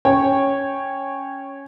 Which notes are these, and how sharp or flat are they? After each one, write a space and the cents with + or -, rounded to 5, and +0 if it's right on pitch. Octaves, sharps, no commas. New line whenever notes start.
C#4 +0 C#5 -10 G5 +0